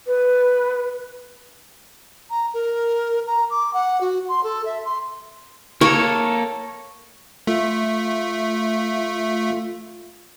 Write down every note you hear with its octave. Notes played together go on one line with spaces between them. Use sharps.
B4
A#5
A#4
A#5
D6
F#5
F#4
C6
A4
E5
C6
A#3 A4 C#5
A3 F4